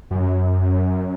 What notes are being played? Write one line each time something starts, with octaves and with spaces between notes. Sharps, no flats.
F#2